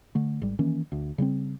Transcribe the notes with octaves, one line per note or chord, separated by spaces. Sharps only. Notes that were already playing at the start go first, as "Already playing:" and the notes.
D3 A3
G#1 G3
D#3 E3 A#3 C#4
D2
C#3 G3 B3 C4